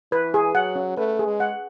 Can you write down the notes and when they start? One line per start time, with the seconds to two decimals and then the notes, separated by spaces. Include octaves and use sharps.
0.12 E3 B4
0.34 G#4
0.55 F#3 F#5
0.76 C#4
0.97 A3 B4
1.19 G#4
1.26 G#3
1.40 F#5